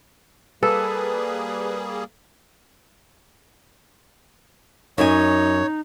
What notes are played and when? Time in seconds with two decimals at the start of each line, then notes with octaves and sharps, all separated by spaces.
0.63 G3 A#3 G#4 A4 B4
4.98 F#2 D#4 C#5 G#5